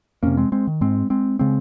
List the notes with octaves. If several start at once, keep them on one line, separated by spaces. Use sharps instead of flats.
F2 C3 A#3 C#4
G#3 C4
G#3 C4
D#3
G#2 G#3 C4
G#3 C4
C#3 G#3 C4